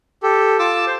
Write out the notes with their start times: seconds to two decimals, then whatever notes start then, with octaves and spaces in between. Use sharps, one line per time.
0.23 G4 A4
0.59 F4 A5 D6 E6
0.87 C5